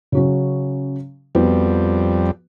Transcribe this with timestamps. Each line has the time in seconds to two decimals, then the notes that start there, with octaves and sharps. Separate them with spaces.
0.12 C#3 F#3 C#4
1.35 F2 F3 G3 B3 F#4